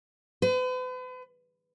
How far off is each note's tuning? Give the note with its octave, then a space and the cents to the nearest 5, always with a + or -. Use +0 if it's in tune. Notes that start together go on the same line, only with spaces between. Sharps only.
B4 +40